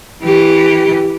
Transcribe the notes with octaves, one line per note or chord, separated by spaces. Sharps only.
E3 G4